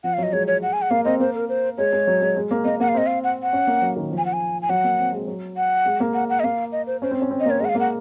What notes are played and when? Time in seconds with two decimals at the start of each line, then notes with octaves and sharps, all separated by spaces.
0.04 F3 F#5
0.14 F5
0.18 F#3
0.23 D#5
0.33 G#3 C#5
0.47 C#5
0.62 F#5
0.73 G#5
0.82 F#5
0.90 A#3 F5
1.05 C4 D#5
1.20 A#3 C5
1.35 A#4
1.49 C5
1.78 G#3 C#5
1.93 G#3
2.07 F#3
2.21 G#3
2.37 G#3
2.51 A#3
2.65 A#3 D#5
2.80 A#3 F#5
2.89 F5
2.94 C4 D#5
3.07 F5
3.24 F#5
3.43 F#5
3.53 C#4
3.67 A#3
3.82 F#3
3.96 D#3
4.11 F3
4.18 G#5
4.26 F#5
4.33 G#5
4.62 G#5
4.69 F#3 F#5
4.84 A#3
4.99 C4
5.12 G#3
5.27 F#3
5.57 F#5
5.85 G#3
6.00 A#3
6.14 F#5
6.30 F#5
6.40 D#5
6.44 A#3 F5
6.72 D#5
6.87 C5
7.02 C#4 C5
7.11 C4
7.22 C#4
7.31 C4
7.40 D#5
7.45 A#3 C#5
7.60 G#3 D#5
7.65 F#5
7.69 F5
7.75 A#3
7.80 F#5